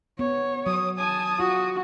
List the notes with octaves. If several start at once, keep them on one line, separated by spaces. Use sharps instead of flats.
B3 C#5
F#3 D#6
G#5 A5 D#6
F4 F#4